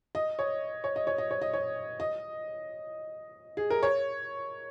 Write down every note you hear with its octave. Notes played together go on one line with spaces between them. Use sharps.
D#5
C#5
C#5
D#5
C#5
D#5
C#5
D#5
C#5
D#5
G#4
A#4
C#5